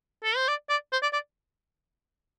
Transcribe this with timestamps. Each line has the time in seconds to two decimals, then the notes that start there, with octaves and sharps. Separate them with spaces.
0.24 A4
0.36 C5
0.48 D5
0.70 D5
0.92 C5
1.03 D5
1.13 D5